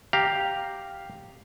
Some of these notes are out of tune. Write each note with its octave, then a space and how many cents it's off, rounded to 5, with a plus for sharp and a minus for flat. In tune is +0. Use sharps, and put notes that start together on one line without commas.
G4 +0 F5 +0 A#5 +0